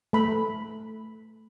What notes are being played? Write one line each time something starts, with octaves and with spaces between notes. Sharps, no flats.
A3 B5